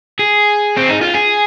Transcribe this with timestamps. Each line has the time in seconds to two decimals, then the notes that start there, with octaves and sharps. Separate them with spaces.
0.19 G#4
0.77 C4
0.89 D#4
1.02 F4
1.14 G#4